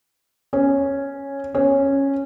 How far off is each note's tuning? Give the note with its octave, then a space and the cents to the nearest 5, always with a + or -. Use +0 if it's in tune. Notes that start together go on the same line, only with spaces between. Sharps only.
C#4 -5
C#4 -10